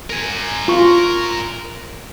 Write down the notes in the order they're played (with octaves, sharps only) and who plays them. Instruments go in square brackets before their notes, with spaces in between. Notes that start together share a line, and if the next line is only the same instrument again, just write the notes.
[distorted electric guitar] A#4 G#5
[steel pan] F4 C#6